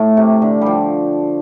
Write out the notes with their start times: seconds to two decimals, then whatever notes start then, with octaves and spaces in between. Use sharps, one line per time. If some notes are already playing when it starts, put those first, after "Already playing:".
Already playing: A2 A3
0.17 C3
0.42 D3
0.61 F3 G3